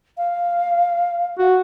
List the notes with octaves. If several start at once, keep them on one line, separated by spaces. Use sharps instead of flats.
F5
F#4